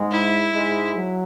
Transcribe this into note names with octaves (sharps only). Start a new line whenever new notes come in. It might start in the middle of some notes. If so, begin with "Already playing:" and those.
Already playing: G#2 G#3
E4
G#2 G#3
F#3